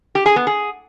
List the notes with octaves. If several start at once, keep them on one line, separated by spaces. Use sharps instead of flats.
G4
G#4
B3
G#4